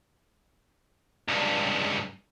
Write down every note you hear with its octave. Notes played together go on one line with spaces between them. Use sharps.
C#2 G2